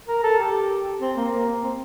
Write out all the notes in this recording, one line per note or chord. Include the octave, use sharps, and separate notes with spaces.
A#4
A4
G4
C4
A#3
C4